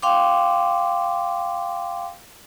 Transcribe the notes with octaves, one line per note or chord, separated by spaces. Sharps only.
F5 G5 C6 D6